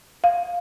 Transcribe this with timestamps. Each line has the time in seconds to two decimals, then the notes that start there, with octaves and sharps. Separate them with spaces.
0.24 F5